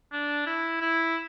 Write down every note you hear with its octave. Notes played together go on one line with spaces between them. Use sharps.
D4
E4
E4